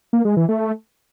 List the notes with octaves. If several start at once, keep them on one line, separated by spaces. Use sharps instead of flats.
A#3
G#3
E3
A3